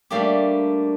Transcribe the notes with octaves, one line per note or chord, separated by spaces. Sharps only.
G3 A3 A#3 D4 G4